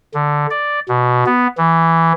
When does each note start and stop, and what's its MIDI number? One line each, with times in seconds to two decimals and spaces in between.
0.14 0.47 50
0.51 0.80 74
0.89 1.24 47
1.26 1.47 59
1.58 2.13 52